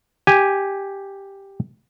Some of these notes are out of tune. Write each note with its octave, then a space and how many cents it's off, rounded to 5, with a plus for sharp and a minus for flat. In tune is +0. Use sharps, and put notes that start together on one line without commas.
G4 +0 G#5 -10